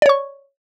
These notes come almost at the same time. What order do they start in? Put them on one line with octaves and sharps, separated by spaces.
D5 C#5 C#6